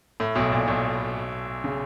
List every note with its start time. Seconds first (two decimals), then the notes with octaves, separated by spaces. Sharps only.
0.20 A2
0.35 B1 B2
0.52 A#2
0.67 B1 B2
1.64 C#3